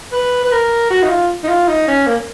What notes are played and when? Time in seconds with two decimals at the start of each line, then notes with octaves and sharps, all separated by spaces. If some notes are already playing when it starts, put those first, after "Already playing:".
0.12 B4
0.44 B4
0.52 A#4
0.90 F#4
1.03 D#4
1.10 F4
1.44 D#4
1.48 F4
1.68 D#4
1.88 C#4
2.07 A#3